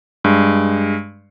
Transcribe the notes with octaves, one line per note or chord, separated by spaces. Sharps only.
G2 G#3